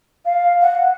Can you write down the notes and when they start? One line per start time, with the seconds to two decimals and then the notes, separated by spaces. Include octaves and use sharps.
0.25 F5
0.61 F#5